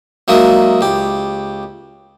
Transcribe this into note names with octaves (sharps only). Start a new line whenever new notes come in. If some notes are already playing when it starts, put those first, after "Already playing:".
F#3 G#3 A#3 D#4 D#5 E5
C#2 G4